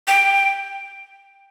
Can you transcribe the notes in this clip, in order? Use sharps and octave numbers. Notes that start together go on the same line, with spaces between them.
G5